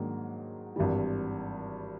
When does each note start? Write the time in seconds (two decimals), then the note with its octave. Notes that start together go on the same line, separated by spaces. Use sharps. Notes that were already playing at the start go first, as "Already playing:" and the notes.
Already playing: G#2 D#3 F#3 A#3 D4
0.76 G#1 G2 E3 G3